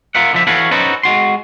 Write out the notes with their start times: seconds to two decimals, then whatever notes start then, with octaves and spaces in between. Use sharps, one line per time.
0.15 F4 A#4 E5 F#5
0.33 D3 F3 E5
0.47 E3 F#4 A4 C#5 F5 B5
0.71 C#4 D#4 F#4 A4 B4 C5
1.03 G#3 F#4 C6